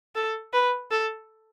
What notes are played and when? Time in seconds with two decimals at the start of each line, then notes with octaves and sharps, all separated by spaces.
0.15 A4
0.53 B4
0.91 A4